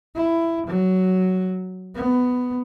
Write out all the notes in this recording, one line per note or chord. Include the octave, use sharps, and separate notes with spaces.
E4
F#3
B3